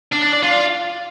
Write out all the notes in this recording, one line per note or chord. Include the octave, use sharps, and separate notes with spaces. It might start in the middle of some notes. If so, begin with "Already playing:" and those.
D4
D4
D5
F4